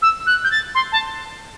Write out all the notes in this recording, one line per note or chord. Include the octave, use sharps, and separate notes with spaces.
E6
F#6
G6
A6
C6
A5